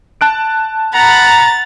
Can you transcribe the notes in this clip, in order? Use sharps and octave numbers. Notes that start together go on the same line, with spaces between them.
A5 F#6 D7
F#5 A#5 B5 A6